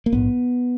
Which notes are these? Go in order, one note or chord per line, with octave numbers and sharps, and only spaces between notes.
A#3
A#1 G#2 B3